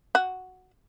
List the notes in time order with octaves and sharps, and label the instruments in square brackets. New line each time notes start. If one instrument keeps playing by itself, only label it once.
[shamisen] F#4